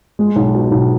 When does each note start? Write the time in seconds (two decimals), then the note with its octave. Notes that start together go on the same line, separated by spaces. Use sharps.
0.19 G#3
0.36 B1
0.54 B2
0.71 B1